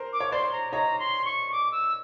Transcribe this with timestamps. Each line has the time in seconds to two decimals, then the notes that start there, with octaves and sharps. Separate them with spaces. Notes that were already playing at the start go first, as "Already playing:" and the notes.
Already playing: A#4 C5
0.13 D6
0.20 C#5
0.32 C5 D5 C6
0.52 A#5
0.72 C#5 D#5 A#5
0.99 C6
1.25 C#6
1.52 D6
1.71 E6